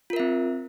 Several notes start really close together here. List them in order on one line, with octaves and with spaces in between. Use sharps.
F4 A#4 E5 C4